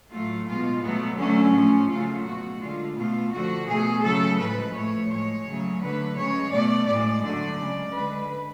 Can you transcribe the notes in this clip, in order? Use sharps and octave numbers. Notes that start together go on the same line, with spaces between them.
A2 F#3 A3 F4
B2 G#3 F4
B2 F#3 A3 B3
D3 F#3 A3 C#4
A2 F3 A3
C#3 F#3 A3 F4
B2 A3 F#4
D3 G#3 F4
B2 A3 F4
D3 F3 A3 F#4
B2 A3 G#4
C#3 F#3 A3 A4
A2 F3 G#3 B4
A2 F3 A3 C#5
A2 G#3 C#5
C#3 F#3 A3
D3 F#3 A3 B4
C#3 G#3 C#5
B2 A3 D5
A2 G#3 D5
D3 F#3 A3
C#3 G#3
D3 G#3 B4